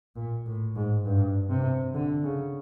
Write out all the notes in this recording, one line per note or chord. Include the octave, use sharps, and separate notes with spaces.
A#2
A2
G#2
G2
C3
D3
C#3